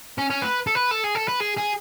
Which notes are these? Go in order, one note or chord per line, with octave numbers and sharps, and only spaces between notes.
C#4
C#4
B4
A4
B4
A4
G#4
A4
B4
G#4
G#4